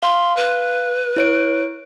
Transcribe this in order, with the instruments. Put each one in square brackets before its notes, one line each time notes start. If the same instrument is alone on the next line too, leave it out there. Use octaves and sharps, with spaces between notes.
[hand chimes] F5 [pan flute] C6
[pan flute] B4
[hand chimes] E4 C#5 D7